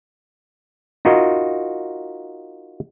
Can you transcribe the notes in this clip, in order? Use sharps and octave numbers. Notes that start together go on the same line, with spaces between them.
D#4 F4 F#4 A#4 D#5